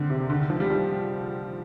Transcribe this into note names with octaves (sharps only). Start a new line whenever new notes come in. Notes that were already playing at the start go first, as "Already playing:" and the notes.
Already playing: D3 D#3 C4
C3
D3
D#3
F3
G3
F3